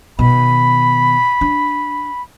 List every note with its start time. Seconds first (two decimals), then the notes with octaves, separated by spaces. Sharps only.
0.19 B2 D#3 B5
1.41 D4